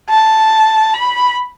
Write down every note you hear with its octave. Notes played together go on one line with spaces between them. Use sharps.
A5
B5